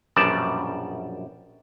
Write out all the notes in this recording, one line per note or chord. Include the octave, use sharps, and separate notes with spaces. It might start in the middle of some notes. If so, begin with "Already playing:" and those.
A#1 F#2 B2 G3 D5 A5